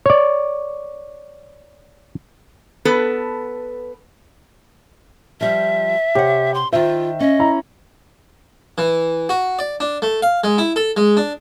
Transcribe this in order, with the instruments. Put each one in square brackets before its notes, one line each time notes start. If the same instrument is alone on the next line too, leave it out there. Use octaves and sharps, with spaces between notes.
[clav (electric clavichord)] C#5 D5
[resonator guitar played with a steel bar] B3 A4 B4
[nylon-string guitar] F3 G3 [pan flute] E5
[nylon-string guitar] C3 F#5 [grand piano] G4 C#5
[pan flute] C6
[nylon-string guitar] D#3 C5 [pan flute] F4 [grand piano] E5
[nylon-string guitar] C#4 [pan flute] D#5
[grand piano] E4 A#5
[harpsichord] E3
F#4
D5
D4
A3
F5
G#3
E4
A4
G#3
D4